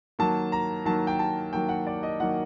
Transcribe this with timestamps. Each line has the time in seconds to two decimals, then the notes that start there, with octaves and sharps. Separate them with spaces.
0.19 D#3 F#3 A#3 A5
0.52 A#5
0.85 D#3 F#3 A#3 A5
1.07 G5
1.19 A5
1.53 D#3 F#3 A#3 G5
1.69 F#5
1.87 D5
2.03 D#5
2.20 D#3 F#3 A#3 F#5